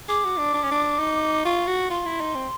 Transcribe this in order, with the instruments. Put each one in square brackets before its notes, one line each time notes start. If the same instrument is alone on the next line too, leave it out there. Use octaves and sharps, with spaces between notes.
[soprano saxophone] G#4 [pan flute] D6
[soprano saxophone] F#4
D4
D4
C#4
D4
D#4
[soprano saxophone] F4 [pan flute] C#6
[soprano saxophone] F#4
[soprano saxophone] F4 [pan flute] C6
[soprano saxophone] E4
D#4
C4